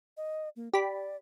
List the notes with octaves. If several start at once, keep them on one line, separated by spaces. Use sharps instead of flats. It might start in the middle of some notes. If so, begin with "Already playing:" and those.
D#5
A#3
G4 D5 B5